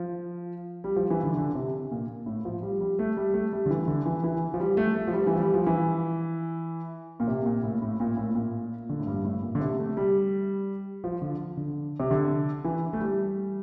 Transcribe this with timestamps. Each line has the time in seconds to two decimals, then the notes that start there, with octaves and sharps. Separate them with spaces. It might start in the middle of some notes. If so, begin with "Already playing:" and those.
Already playing: F3
0.84 G3
0.96 F3
1.10 E3
1.23 D3
1.37 D3
1.55 C3
1.91 A#2
2.26 A2
2.45 F3
2.62 G3
2.80 G3
2.99 A3
3.17 G3
3.34 A3
3.52 G3
3.66 D3
3.70 E3
3.88 D3
4.06 E3
4.24 E3
4.54 F3
4.60 G3
4.77 A3
4.95 A3
5.07 F3
5.13 G3
5.27 E3
5.36 F3
5.40 G3
5.54 F3
5.67 E3
7.20 A#2
7.27 C3
7.46 A#2
7.63 A2
7.82 A2
8.00 A#2
8.17 A2
8.35 A#2
8.89 D3
8.99 A2
9.07 G2
9.25 A2
9.42 A#2
9.55 D3
9.60 C3
9.79 A3
9.97 G3
11.04 F3
11.22 D3
11.57 D3
12.00 C3
12.11 D3
12.65 E3
12.93 A3
13.00 G3